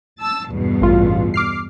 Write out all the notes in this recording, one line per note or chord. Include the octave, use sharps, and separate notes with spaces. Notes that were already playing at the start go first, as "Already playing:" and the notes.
A5 E6
E2 G2 B2
A1 F4
D6 F6 C7